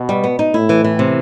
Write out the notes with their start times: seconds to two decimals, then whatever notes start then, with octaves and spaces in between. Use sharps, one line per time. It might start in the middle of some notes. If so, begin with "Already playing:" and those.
Already playing: B2
0.09 G3
0.24 B3
0.39 D#4
0.54 A2 E4
0.69 E3
0.84 E3
0.99 C3